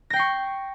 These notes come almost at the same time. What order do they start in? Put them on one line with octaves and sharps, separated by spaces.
A#6 G5 C7 C#6